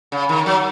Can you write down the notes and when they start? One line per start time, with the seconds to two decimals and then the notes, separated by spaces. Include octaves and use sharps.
0.12 C#3
0.29 D#3
0.46 F#3